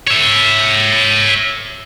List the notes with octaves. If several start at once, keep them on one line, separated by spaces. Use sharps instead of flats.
C#5 E5